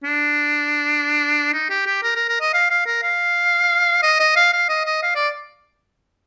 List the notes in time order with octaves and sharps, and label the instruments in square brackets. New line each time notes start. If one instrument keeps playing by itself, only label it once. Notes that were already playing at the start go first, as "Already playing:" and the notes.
[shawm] D4
D#4
G4
G4
A#4
A#4
A#4
D#5
F5
F5
A#4
F5
D#5
D#5
F5
F5
D#5
D#5
F5
D5